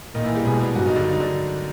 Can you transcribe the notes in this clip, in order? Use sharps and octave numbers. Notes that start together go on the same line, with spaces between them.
A#2 D#3 D#4
E3 E4
G3 G4
B2 G#3 G#4
G3 G4
G2 F#3 F#4
D#3 D#4
D3 D4
D#4
D3 D4